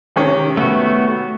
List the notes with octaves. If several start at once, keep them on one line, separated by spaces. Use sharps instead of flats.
C3 D#3 C#4
A3 B3 F#4